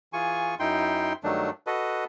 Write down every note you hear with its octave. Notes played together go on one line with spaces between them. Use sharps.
E3 F4 G#4 G#5 C#6
F#2 D#4 E4 G5 C6
G2 D#3 F#3 A3 D4
F#4 A4 B4 D#5